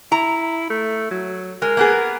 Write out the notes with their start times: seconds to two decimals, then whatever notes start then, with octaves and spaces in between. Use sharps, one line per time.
0.12 E4 A#5
0.70 A3
1.11 F#3
1.62 G#3 A#4
1.77 A#3 B3 G#4